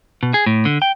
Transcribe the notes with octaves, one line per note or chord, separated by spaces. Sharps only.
B2
G#4
A2
D3
G5